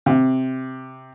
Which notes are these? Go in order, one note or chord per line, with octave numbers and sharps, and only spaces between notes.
C3